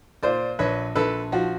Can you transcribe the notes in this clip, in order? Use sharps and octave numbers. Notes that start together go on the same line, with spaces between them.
A#2 C5 D5
A#1 B4 C#5
A#1 A4 B4
F3 F#4